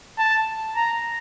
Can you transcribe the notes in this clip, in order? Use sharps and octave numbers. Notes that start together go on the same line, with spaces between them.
A5
A#5